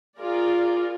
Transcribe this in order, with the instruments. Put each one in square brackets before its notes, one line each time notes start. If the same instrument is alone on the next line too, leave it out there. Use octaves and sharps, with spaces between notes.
[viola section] F4 G#4 A#4 D5